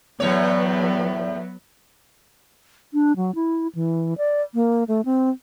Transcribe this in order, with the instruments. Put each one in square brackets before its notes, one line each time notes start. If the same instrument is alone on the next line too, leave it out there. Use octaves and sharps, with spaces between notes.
[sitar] E2 A2 C#5 [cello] F#3 B3
[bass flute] D4
F#3
E4
E3
D5
A#3
A3
C4